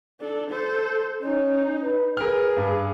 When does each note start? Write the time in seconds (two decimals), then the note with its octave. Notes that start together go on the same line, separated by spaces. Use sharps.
0.20 D4 A4
0.50 A4 C5
1.23 C#4 D#4
1.83 B4
2.17 G#4 A#4 B4 F6
2.57 G2